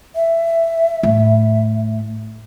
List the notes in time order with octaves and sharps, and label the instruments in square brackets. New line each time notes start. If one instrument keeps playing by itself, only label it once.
[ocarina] E5
[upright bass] A2